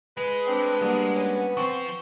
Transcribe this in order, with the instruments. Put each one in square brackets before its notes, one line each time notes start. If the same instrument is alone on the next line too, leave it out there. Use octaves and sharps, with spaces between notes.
[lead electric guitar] G#3 [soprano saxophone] B4
[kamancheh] C4 D4
[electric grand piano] G3 A#3 D4 [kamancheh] B3
[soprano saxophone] C#4
[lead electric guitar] F3 C5 [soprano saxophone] C4 [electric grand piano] C#6